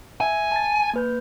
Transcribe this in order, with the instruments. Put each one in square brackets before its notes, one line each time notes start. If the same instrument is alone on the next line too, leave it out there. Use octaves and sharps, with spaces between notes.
[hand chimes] E5 [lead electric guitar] G#5
[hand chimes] A5 A6
A#3 B4 G6